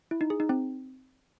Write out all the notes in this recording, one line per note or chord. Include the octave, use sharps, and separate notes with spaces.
E4
D#4
G#4
D#4
C4